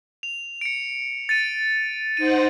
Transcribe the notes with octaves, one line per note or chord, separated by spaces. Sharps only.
F7
C#7 D7
A6 C#7 D#7
D#4 C5 F#5 D#7